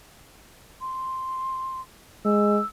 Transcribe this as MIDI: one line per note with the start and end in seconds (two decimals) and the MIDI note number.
0.81 1.80 84
2.25 2.59 56
2.25 2.66 88